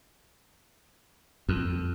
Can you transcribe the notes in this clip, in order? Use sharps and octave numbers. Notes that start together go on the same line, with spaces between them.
F2